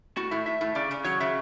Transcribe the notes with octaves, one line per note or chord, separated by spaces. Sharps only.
A2 F#4
A2 E5
A2 E5
A2
C#3 D5
C#3
F#3 C#5
C#3 E5